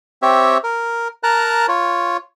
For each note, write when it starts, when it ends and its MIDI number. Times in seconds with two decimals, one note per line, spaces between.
0.22 0.58 60
0.22 0.58 67
0.22 0.58 73
0.22 0.58 76
0.64 1.08 70
1.23 1.66 70
1.23 1.66 81
1.23 1.66 82
1.23 1.66 90
1.68 2.17 65
1.68 2.17 73